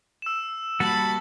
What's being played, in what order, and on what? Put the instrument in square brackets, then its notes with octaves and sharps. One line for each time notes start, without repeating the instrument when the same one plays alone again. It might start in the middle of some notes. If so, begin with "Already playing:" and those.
[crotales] E6 E7
[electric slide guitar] G3 A#3 F#4 [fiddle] A5 B5 [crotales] A6 F#7